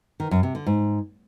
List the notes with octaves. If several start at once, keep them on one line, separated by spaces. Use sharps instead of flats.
D#3
F#2
C3
D3
G#2